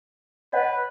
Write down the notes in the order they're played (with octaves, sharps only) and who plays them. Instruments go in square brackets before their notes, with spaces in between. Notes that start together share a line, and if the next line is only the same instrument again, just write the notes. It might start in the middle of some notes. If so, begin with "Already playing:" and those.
[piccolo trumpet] B4 [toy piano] C#5 D#5 F#5